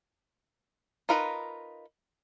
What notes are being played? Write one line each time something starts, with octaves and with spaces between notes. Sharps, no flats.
D#4 F4 A#4 B4 B5